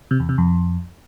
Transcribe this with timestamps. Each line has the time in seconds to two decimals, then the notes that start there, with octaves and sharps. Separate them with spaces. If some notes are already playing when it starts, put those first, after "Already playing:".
0.11 C3
0.20 E2
0.29 C3
0.38 F2